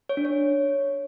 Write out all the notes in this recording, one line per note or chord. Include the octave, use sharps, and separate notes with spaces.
C#5
D4
C#5